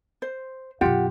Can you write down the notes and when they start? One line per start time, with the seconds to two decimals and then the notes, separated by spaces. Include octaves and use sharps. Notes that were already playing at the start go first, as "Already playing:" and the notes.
0.22 C5
0.81 F#2 B2 F4 G4 F#5